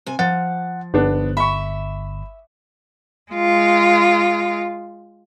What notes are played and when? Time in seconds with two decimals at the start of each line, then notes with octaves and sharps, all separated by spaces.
0.06 C3 G#5
0.19 F3 F#5 A6
0.94 G1 B3 D4
1.37 E5 B5 C#6
3.32 G#3 F4